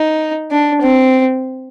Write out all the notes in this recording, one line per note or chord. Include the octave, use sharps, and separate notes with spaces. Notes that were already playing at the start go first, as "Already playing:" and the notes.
Already playing: D#4
D4
C4